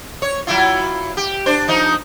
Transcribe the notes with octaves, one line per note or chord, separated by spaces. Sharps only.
C#5
F#3 E4 F4
G4
D4 C5
F3 D#4